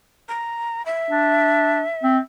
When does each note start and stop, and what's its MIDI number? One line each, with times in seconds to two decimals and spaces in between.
0.29 0.84 82
0.86 2.19 76
1.11 1.83 62
2.03 2.18 60